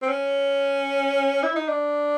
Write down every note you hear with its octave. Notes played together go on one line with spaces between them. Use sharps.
C4
C#4
E4
D#4
D4